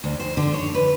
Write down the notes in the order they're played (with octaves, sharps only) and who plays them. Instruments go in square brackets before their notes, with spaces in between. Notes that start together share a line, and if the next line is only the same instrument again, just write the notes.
[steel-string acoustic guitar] D2
C5
D3
C#5
B4